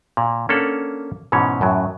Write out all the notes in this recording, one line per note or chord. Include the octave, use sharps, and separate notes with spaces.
A#2
A#3 C#4 D4 A4 C#5 F#5
G#2 B2 E3 C#4 C#5
F#2 A2 F#3